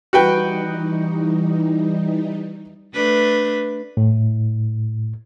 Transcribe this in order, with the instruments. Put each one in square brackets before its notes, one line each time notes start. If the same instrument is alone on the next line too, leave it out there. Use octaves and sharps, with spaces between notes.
[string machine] E3 G3 D#4 [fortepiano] F#4 B4 G5
[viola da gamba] A3 D4 B4
[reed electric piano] A2